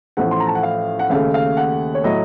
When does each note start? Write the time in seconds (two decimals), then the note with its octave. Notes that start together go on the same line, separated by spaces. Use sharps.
0.17 A1 A2 F3 A3 F#5
0.31 C6
0.40 A#5
0.47 A5
0.55 F#5
0.63 F5
0.99 F#5
1.10 D#2 C#3 A3 F5
1.34 F5
1.57 F#5
1.95 C#5
2.04 A2 F#3 D#5